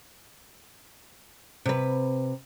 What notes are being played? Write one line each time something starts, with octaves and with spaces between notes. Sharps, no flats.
C3 B4